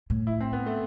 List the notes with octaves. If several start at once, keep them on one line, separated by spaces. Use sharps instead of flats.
A2
E4
C4
B3
A3